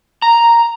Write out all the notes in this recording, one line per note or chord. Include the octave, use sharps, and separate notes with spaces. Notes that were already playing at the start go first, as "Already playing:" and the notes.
A#5